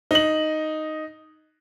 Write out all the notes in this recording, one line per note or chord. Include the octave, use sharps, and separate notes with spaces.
D#4 F#7